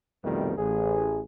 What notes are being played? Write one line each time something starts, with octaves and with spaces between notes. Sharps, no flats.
C2 F2 B2 D#3 G3 A3
A1 G#4